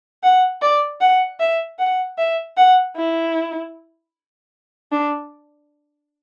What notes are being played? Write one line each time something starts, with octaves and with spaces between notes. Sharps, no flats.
F#5
D5
F#5
E5
F#5
E5
F#5
E4
D4